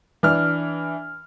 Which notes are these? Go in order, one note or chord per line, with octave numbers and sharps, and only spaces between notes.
E3 D4 F6